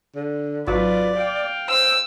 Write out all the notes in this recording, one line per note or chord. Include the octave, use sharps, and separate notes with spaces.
D3
G#1 F#3 F4 B4 D5
F5 G5
C5 E6